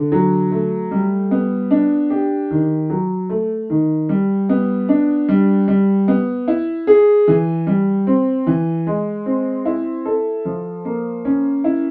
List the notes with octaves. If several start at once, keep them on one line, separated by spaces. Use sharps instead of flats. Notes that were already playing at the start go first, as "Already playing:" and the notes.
Already playing: D3
F#3
A3
G3
B3
D4
G4
D#3
F#3
A3
D#3
G3
B3
D4
G3
G3
B3
E4
G#4
E3
G3
C4
E3
G#3
C4
E4
A4
F3
A#3
C#4
E4